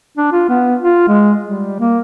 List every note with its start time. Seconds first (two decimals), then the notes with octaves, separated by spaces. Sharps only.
0.18 D4
0.33 F4
0.49 B3
0.82 F4
1.08 G#3
1.43 G3
1.80 A#3